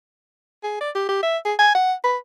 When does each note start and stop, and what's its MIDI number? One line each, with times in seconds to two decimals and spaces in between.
0.64 0.77 68
0.81 0.90 74
0.95 1.08 67
1.09 1.20 67
1.23 1.37 76
1.45 1.54 68
1.59 1.73 80
1.75 1.93 78
2.04 2.17 71